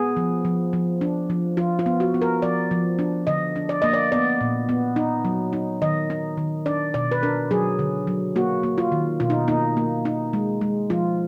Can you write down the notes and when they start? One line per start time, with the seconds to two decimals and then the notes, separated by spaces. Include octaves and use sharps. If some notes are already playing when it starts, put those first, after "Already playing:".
Already playing: B3 G#4
0.17 F3
0.45 F3
0.73 F3
1.01 D4
1.30 F3
1.57 F3 F4
1.79 F4
1.86 B3
2.00 F#4
2.14 B3
2.22 A#4
2.42 F3 D5
2.71 F3
2.99 D4
3.27 D3 D#5
3.56 D4
3.69 D5
3.82 A#3 D#5
3.93 D5
4.12 B3 D5
4.41 A#2
4.69 B3
4.96 D#4
5.25 F#3
5.53 D#4
5.82 D#3 D#5
6.10 D#4
6.37 D#3
6.66 D4 D5
6.94 B2 D5
7.12 B4
7.23 D4 A#4
7.51 F#3 G#4
7.79 D3
8.07 F#3
8.36 A#3 F#4
8.63 A#3
8.78 F4
8.92 D#3
9.20 B2 F4
9.30 D#4
9.48 A#3 D#4
9.77 A#3
10.05 D#4
10.33 G#3
10.61 G#3
10.90 F3 F4